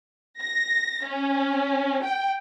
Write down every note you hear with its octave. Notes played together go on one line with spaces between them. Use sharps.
A#6
C#4
G5